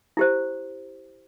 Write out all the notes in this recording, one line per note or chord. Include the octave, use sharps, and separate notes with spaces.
E4 G4 C5